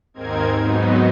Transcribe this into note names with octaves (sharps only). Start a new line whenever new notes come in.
D#2 G#2 C4 D#4 A#4 G#6
G#2 F#3 B3 D#4